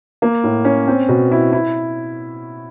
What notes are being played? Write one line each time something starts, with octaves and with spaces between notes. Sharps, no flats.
A#3
A2
C#4
C4
B2
E4
E4